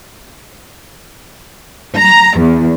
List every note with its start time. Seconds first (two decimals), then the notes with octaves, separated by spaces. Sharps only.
1.97 A#5
2.38 E2